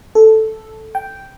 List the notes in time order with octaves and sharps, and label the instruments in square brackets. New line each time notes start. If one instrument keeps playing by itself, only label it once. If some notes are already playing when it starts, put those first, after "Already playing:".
[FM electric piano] A4
G5